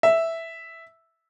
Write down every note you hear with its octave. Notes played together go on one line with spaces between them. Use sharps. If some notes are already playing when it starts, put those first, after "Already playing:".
E5